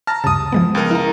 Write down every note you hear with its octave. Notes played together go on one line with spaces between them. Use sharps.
A5 A#5 F6 A#6
D2 G2 C#3 A5 D#6
F3 G#3 B3
C#2 A#4
E4 A#5